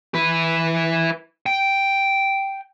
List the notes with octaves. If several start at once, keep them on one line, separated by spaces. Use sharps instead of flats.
E4 B4
G5